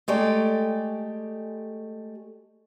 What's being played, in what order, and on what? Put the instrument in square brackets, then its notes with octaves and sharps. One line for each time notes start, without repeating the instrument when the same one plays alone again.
[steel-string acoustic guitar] G#3 A3 G4 D5